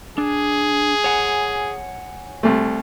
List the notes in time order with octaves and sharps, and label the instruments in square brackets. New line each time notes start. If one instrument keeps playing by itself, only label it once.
[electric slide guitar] D4 [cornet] G#4
[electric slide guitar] C#5 F#5 G#5
[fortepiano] C2 A3